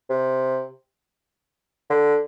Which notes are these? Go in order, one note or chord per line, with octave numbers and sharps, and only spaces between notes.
C3
D3